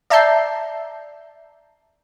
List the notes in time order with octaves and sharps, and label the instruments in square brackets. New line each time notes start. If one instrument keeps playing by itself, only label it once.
[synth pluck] D5 E5 A5 A#5 G6 C7